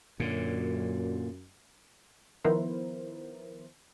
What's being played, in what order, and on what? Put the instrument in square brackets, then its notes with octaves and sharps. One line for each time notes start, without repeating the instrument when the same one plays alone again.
[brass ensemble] F#2 [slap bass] A#2 D3
[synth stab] D#3 F3 B3 E4 A#4 C5